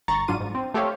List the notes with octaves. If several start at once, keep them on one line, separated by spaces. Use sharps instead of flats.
G1 A#5 C#6 A6
G#2 F#3 D4 F4 D#7
G#2
C4
A3 G4 A4 C5 C#5 F5